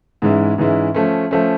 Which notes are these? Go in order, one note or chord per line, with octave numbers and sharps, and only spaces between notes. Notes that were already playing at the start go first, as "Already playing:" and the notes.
G#2 E3 G#3 C#4 E4
G#2 E3 G#3 C#4 E4
F3 A3 C#4
F3 A3 C#4